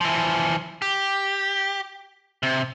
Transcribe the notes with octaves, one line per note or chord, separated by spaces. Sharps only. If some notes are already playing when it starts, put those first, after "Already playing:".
E3 F3
G4
C3